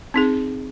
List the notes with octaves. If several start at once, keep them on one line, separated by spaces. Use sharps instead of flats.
C4 D#4 G#4